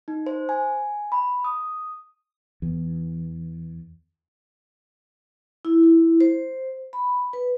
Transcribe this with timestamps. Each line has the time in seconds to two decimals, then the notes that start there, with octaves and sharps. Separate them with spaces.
0.08 D#4
0.26 C5
0.49 G#5
1.12 B5
1.44 D#6
2.62 E2
5.65 E4
5.83 E4
6.21 C5
6.93 B5
7.33 B4